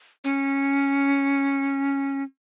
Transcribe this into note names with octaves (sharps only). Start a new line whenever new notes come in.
C#4